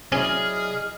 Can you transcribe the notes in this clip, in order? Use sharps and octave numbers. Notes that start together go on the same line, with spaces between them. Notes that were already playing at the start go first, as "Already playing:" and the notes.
F#3 C#4 E4 G#4 D5 D#5 F6